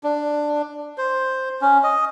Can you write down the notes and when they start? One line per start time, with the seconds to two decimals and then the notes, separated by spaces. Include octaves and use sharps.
0.04 D4
0.98 C5
1.61 C#4
1.83 D#5